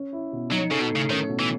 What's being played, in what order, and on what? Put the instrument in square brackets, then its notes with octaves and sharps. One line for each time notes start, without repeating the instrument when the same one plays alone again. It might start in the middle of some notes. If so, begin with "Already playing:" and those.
Already playing: [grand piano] C#4
E4
B2
[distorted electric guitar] F#3 [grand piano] D#4
[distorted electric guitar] C#3 [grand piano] A4
[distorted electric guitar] B2
[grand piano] A2
[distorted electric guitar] C#3
[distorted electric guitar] D#3 [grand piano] C#4
[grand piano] B2
[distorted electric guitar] E3